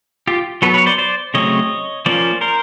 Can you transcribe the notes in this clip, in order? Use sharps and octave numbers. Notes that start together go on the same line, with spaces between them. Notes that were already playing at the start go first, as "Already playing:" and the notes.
F4 G4
F#3 B3 A4 B4
B4 C#5
C5 D5
C5 D5
C#3 F#3 A3 C4 C#5 D#5
F3 A#3 C#4 C5 D5
A#4 C5